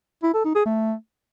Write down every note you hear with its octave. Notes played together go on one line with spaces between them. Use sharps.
E4
A4
D#4
G#4
A3